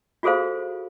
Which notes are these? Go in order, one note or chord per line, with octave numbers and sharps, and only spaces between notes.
F4 F#4 G#4 A4 C5 F5